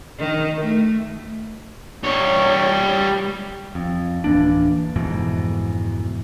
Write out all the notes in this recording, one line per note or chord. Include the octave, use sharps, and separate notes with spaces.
D#3
A3
G3 C#5
F2
D1 E3 A#3 D4
F2 G#2 B2 E3